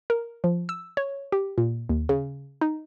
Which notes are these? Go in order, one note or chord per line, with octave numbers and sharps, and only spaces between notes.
A#4
F3
E6
C#5
G4
A#2
D#2
C#3
D#4